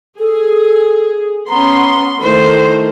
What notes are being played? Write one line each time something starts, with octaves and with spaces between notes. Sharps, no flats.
G#4 A4
B3 C#4 A#5 C6
D#3 A3 E4 C5